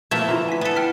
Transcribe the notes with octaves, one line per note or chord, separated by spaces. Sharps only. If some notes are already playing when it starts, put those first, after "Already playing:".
A#2 E3 F3 A3 A#3 E5 G#6
D3 E3 E4 F4 A#5
G#5 B6
B3 A4 G#5 B6
G5 F6 B6